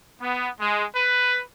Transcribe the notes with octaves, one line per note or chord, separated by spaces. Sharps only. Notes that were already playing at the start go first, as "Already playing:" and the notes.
B3
G#3
B4